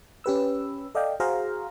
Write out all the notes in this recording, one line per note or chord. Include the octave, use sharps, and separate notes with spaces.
C#4 G4 B4 E6
A4 D5 D#5 F5 G5
F#4 G#4 C5 F5 A#5